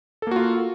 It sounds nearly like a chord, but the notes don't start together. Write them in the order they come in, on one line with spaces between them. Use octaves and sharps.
A4 A#3 F#4 F4